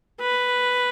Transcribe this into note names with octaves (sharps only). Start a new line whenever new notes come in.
B4